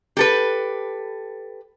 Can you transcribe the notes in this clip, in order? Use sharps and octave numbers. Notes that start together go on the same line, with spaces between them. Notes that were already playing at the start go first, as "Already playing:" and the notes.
G4 A4 B4